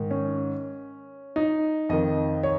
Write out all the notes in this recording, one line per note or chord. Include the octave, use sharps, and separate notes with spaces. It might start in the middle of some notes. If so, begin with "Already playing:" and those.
Already playing: G#2 D#3
C#4
D#4
F2 D#3 D#5
C#5